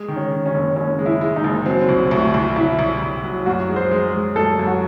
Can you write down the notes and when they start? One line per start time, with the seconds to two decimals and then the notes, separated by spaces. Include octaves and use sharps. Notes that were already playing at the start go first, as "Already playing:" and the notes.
Already playing: G#3
0.08 D#3
0.16 C#4
0.32 D#3
0.46 C#4
0.54 F#1
0.76 F#1 C#4
0.99 G#3
1.06 E4
1.21 G#3
1.36 D#4
1.44 F#1
1.66 F#3 C4
1.89 C2
2.11 C2 A3
2.34 C2
2.56 C2 E4
2.79 C2
3.01 C2
3.24 F#3
3.46 F#2 F#4
3.69 G#3
3.76 C5
3.91 G#3
4.14 G#3
4.36 F#2 A4
4.59 F#2
4.67 F#4